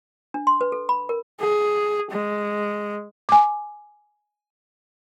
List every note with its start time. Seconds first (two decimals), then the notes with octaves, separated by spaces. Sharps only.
0.34 D4
0.47 C6
0.61 B4
0.72 A4
0.89 B5
1.09 A#4
1.40 G#4
2.11 G#3
3.29 G#5 D6